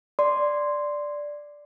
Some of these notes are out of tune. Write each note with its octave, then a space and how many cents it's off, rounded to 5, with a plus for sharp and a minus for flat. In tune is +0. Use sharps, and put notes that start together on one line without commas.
D5 +0 C6 -5